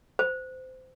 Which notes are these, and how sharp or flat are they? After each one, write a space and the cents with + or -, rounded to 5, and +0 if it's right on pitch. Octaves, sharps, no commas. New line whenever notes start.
C5 -25